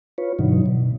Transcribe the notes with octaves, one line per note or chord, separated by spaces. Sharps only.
F4 B4 C#5
G2 B2 D3 E3 F#3 D#4
B2